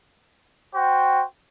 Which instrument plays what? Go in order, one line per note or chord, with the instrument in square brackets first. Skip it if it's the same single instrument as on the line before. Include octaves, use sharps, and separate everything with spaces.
[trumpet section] F#4 C5 G5